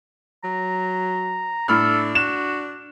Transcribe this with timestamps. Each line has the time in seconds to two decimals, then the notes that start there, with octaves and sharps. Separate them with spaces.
0.44 F#3 A#5
1.68 A2 D4 A4 B5 F6
2.15 F#4 E7